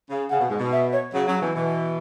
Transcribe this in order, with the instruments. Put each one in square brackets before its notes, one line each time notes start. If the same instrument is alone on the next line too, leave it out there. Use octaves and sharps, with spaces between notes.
[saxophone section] C#3
[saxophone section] C#3 [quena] F#5
[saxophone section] B2
G#2
B2
[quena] E5
C#5
[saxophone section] C#3 F#3
C#3 F#3
B2 E3
B2 E3